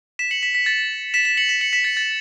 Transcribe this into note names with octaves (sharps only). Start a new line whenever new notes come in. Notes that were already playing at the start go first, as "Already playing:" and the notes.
B6 E7
C#7 F#7
B6 E7
B6
A6
B6 E7
B6 E7
C#7 F#7
B6 E7
C#7 F#7
B6 E7
A6 C#7
A6